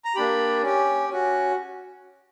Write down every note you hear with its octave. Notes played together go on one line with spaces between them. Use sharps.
A#5
A#3 D4 G4 B5
C#4 G4
C#4 F#4